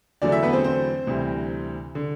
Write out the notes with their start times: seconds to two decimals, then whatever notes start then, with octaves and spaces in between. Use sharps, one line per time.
0.22 E2 D3 F#3 A3 D4 D5
0.32 E4 E5
0.43 B3 B4
0.53 C4 C5
0.64 C4 C5
1.07 D2 C3 E3 G3
1.95 D3